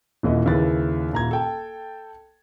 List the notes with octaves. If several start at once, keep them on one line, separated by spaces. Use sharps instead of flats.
D#1 D#2 E4 D#5
D#2 C#3 E4 B4 A6
D#1 A#5 G#6
A4 G5 A5